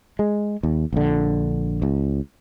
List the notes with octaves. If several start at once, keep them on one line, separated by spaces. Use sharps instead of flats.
G#3
D#2
A#1 D3
C#2